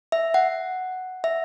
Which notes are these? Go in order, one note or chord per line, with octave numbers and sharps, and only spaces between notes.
E5
F#5
E5